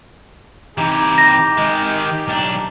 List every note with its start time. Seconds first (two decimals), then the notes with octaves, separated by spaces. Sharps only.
0.78 C3 E3 D#4 G4 A#5
1.18 A#6
1.58 D#3 G#3 D#5
2.28 B1 D4 A#5